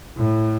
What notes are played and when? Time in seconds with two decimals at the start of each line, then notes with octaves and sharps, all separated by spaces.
0.17 A2